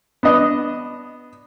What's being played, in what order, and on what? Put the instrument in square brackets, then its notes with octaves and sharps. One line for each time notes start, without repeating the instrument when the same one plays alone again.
[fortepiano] B3 D4 D#5